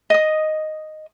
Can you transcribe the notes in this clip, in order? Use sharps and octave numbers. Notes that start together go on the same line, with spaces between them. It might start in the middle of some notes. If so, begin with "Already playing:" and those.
D#5 D#6